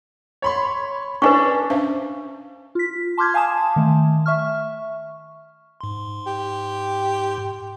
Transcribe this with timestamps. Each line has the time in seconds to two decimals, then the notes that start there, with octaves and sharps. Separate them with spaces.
0.42 C#5 B5 C6
1.22 C#4 D4 B4 G#5 C#6
1.70 C#4 D4 C5 E5 F5
2.75 F4 B6
3.17 A5 C6 D6 F6 G6 G#6
3.34 F5 G#5 A5 D#6 E7
3.76 D#3 A3
4.26 E5 C#6 F6
5.81 G#2 C6
6.26 G4